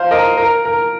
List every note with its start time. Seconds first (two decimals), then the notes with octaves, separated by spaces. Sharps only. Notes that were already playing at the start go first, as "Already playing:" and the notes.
Already playing: C5 F5
0.11 A#4 D#5
0.37 A#4
0.65 A#4